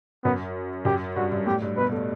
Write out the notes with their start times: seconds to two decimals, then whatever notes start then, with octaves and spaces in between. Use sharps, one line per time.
0.24 F#2 B3
0.85 F#2 G4
1.16 G2 F#4
1.32 G2
1.46 A2 G4
1.62 G2
1.77 B2 B4
1.87 B3
1.92 A3